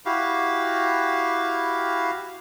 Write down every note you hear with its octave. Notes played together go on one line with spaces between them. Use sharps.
E4 F#4 G4 F5